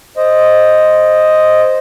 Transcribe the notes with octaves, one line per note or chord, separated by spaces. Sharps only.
C5 D#5